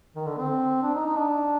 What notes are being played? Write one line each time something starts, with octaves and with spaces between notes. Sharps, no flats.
D#3
D3
C4
D4
D#4
D#4
D4